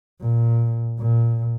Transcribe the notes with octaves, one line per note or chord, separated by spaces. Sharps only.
A#2
A#2